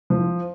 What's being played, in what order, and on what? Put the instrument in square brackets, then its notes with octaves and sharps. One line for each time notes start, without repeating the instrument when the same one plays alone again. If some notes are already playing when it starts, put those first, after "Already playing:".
[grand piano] F3